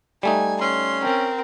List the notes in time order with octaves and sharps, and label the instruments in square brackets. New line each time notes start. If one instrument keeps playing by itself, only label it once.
[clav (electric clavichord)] G3 A3 D#4 [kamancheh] G#5
[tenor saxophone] C#4 [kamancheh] C6
[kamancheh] C4 A#4